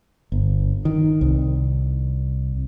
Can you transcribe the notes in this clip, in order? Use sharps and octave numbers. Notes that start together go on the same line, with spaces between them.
G1
D#3
C2